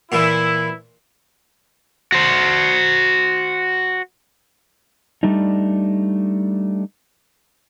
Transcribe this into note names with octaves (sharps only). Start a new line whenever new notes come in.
A#2 E3 E4
F#4 C5
G3 A3 D4 D#4